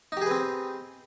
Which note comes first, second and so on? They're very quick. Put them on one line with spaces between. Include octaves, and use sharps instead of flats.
D#4 G4 G#4 B4 C4